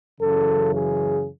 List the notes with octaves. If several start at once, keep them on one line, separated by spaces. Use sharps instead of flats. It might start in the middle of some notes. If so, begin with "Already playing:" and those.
F#2 C#3 E3 A4
G#4